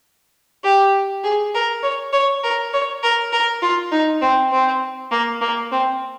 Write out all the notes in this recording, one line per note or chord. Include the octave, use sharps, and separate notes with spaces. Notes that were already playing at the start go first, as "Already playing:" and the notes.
G4
G#4
A#4
C#5
C#5
A#4
C#5
A#4
A#4
F4
D#4
C4
C4
A#3
A#3
C4